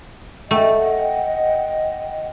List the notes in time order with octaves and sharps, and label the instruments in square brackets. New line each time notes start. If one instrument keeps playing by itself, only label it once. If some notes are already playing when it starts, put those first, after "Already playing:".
[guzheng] A3 [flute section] D#5 F#5 G5